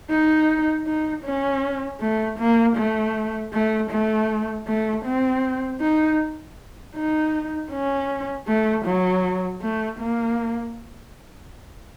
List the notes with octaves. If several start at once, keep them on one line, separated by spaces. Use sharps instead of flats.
D#4
D#4
C#4
A3
A#3
A3
A3
A3
A3
C4
D#4
D#4
C#4
A3
F#3
A3
A#3